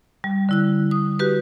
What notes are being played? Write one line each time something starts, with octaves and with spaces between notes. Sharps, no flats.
G3
D3 E4 F#6
D#6
F#4 G4 B4